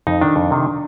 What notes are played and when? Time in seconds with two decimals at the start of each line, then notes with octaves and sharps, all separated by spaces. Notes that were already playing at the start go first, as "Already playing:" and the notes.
0.07 F2 D#4
0.21 D#3 D4
0.36 F2
0.51 C3 D#3